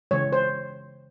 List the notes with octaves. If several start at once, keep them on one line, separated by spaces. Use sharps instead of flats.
C#3 E3 G#3 C#5
C5